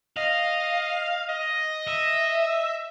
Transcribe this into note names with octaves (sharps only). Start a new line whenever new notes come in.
D#5 F5
D#5
E5